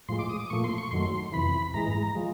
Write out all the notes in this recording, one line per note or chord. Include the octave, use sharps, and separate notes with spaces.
A2 F3 G#3 C6
D6
D#6
D6
A#2 F3 A3 C#6
C6
C#6
F#2 D#3 F#3 A3 C6
F2 C3 E3 B5
G#2 E3 G#3 A#5
F3 G#3